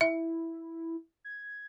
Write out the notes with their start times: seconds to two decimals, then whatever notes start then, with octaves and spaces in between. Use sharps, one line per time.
0.01 E4 E5
1.24 G#6